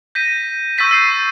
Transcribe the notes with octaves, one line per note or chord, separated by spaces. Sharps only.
G6 A#6 B6 D#7
C#6 E6 G6 A6 B6 D#7
E6 G6 A6 C7 D#7